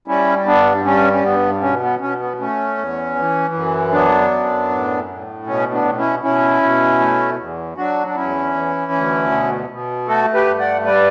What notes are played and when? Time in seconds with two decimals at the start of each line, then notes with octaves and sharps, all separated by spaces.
0.08 G3 C#4 E4
0.46 G2 B3 D4
0.85 G3 C#4
1.13 C#4
1.24 G2 B3
1.61 B2 C#4
1.82 B3
2.00 B2 C#4
2.20 B3
2.39 A3 C#4
2.78 E2
3.16 E3
3.54 F#2
3.92 F#3 B3 D4
4.31 F#2
4.70 A2
5.08 A2
5.46 B2 C#4
5.73 B3 D4
5.85 B2
5.97 C#4 E4
6.23 B2 C#4 E4
6.62 B2
7.00 A3
7.38 E2
7.77 F#3 D4 F#4
8.07 D4
8.15 E2 C#4 E4
8.54 E3
8.92 D2
9.31 B2
9.70 B2
10.08 A3 F#4 A4
10.34 G4 B4
10.46 G2
10.59 D5 F#5
10.84 G3 B4 D5